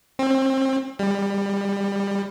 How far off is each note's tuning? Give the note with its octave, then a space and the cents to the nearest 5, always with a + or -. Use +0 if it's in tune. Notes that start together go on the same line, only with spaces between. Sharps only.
C4 +30
G3 +25